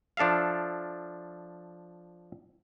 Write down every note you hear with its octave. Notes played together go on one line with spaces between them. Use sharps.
F3 D4 A4 E5 F5